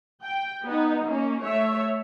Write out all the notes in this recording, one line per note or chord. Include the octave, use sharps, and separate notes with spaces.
G5
B3 D#4
A#3 C#4
A3 C#5 E5